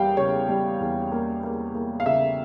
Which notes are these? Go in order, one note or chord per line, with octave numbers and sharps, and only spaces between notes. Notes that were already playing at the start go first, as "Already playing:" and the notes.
Already playing: E2 G3 A#3 F5 G5
C#3 C#5
G3
E2
A#3
A#3
A#3
F5
C#3 E5